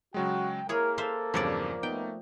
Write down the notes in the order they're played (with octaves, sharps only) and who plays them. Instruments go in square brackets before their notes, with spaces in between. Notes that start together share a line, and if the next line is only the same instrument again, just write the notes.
[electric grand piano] C#3 F#3 G#3 [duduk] F#4 [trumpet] G5
[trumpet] A#3 [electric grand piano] E4 [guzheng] G#4 C#5 [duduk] A#4
[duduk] A4 [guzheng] C5 E5 F5
[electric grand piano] E2 G2 C#3 [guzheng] F3 C#5 D5
[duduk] A3 [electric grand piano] B3 D#4 [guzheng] G5